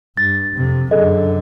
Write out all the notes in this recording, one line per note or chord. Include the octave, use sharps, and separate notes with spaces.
G2 A6
F2 C3
F#2 D3 G#4 A4 D#5